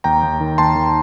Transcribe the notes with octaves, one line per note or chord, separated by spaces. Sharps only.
D#2 G5 A#5
D#2
D#3
D#2 A5 C6
D#3